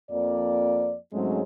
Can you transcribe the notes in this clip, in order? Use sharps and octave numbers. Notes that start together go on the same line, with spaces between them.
F2 F3 A#3 D5
G#2 F#3 G#3 A3 C4 C#4